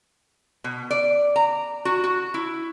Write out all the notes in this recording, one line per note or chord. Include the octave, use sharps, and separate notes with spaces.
B2
D5
A#5
F#4
F#4
E4